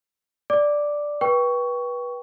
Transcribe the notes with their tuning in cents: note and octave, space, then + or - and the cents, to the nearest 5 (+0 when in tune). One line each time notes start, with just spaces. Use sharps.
D5 +0 D6 +0
B4 -25 G5 +0 C#6 +15